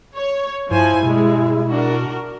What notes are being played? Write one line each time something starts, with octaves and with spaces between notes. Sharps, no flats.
C#5
G2 F3 E4 C5 G#5
B2 G3 G#3
D4 F#4 A#4